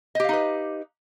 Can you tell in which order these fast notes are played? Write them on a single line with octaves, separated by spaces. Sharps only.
D#5 G4 F5 D#4 B4